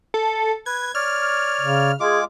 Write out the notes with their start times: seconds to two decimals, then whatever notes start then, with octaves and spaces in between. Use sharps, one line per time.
0.14 A4
0.66 B4 G#6
0.95 C#5 D5 F6
1.61 C#3
2.00 G#3 F4 G#4 D6